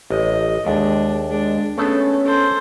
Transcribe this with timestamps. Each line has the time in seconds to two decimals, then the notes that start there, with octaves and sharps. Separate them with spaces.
0.10 A1 D#5
0.66 D#2 G#3 D4
1.31 G#3 D4
1.78 A3 B3 C#4 G#4 A4
2.26 A4 C5